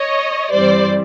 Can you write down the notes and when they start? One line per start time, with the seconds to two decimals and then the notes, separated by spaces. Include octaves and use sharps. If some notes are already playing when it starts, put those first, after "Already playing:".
Already playing: C#5 D#5
0.51 G2 E3 G3 C4 E4 C5 D5